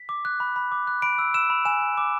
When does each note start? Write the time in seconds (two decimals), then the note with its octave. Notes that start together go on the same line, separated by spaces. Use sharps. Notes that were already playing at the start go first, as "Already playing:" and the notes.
Already playing: B6
0.09 D6
0.25 F#6
0.40 B5
0.56 B5
0.72 D6
0.87 F#6
1.02 B5 D7
1.19 E6
1.34 E6 E7
1.50 B5
1.65 G#5 E7
1.81 G#5
1.98 D6